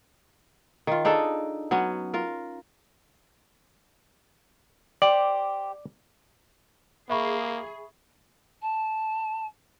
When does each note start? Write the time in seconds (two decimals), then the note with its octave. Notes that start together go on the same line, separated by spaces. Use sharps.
0.87 D#3 F4
1.05 D4 D#4 G#4 A4
1.71 F#3 B3 C#4
2.14 F4 A#4
5.02 G4 C5 D5
7.09 A#3 G#4 E5 B5 C#6
8.62 A5